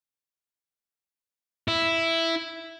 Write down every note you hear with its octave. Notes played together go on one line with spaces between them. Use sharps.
E4